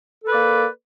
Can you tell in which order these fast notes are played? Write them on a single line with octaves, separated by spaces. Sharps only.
A4 B4 D5 A#3